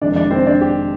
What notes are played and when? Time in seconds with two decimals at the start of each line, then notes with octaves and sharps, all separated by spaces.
0.02 F1 F2 D#3 G#3 D4 D5
0.16 D4 D5
0.31 C4 C5
0.46 D4 D5
0.61 G4